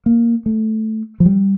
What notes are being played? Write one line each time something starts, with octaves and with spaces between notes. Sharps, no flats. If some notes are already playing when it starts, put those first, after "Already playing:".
A#3
A3
F3
G3